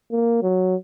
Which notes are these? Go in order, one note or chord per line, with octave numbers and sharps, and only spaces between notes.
A#3
F#3